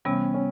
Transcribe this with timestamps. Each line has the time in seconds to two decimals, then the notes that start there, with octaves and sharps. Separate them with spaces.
0.05 C3 E3 G3 B3 C#4
0.34 C#4